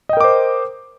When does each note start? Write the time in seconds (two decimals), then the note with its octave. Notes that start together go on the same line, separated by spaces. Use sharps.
0.09 D#5
0.13 G5
0.17 A#4
0.20 D6
0.24 C5